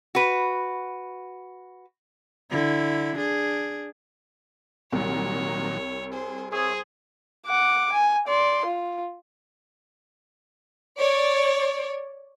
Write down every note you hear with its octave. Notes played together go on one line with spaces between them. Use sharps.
F#4 B4
D3 E4
D4 G#4
C2 A#2 D#3 F#3 C#5
G#4 C5
G#4 C5 C#5 E5
F#5 D6
G#5
D5 C6
F4
C#5 D5